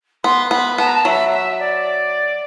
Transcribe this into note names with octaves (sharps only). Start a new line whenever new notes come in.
B3 C6
B3 B5
B3 A5
A#5
A5
F#3 E5
E5
D5